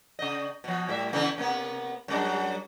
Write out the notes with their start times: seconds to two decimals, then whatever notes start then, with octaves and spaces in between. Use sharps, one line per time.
0.19 C#3 D#5
0.64 B2 F3
0.89 A2 G3 E5
1.13 C#3 E3 B3
1.38 C3 A#3 B3
2.08 F#2 G3 D4